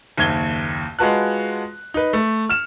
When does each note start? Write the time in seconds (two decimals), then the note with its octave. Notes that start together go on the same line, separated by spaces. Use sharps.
0.17 F#1 D#2 G#6 G7
0.99 G#3 F4 F#4 B4 A5 F#6
1.94 D#4 B4
2.13 A3
2.49 F6 E7